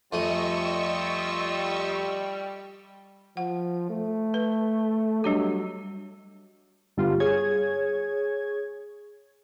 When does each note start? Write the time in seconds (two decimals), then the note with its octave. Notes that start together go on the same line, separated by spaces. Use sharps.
0.13 F2 G3 A3 F4 D#5 G#5 C#6 E6
3.37 F3 F#5
3.90 A3
4.34 B4
5.24 F#3 G3 D4 G4
6.97 G2 D3 G3 B3 F4
7.20 G#4 C#5 G#6